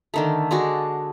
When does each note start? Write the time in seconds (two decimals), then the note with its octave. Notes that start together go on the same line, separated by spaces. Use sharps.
0.14 D3 D#3 A3
0.51 D3 G#3 D4 F#4